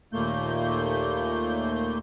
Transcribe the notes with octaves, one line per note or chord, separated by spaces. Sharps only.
D#2 A#2 A3 A#3 G6